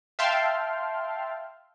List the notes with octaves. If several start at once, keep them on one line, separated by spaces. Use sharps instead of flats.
E5 F5 G5 A5 C6 F6